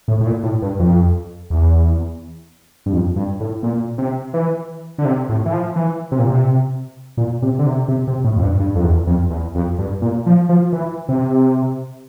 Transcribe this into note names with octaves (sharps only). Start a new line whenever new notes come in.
A2
A2
A#2
A2
G2
F2
E2
G2
F2
G2
A2
A#2
C3
E3
D3
C3
A2
E3
F3
E3
C3
A#2
C3
A#2
C3
D3
C3
C3
C3
A2
F2
G2
G2
F2
E2
F2
E2
F2
G2
A#2
F3
F3
E3
C3